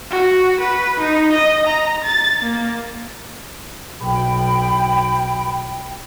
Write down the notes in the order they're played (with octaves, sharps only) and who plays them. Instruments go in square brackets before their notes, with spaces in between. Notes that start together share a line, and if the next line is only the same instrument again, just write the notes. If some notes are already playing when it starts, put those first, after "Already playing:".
[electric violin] F#4
B4
D#4
D#5
A#5
A6
A#3
[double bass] B1 [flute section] G5 [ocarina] B5